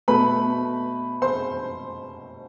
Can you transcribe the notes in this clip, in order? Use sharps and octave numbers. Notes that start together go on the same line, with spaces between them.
B2 A3 B4 B5
C5 C6